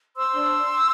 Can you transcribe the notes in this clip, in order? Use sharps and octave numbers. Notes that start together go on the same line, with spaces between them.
C5 C6 E6
D4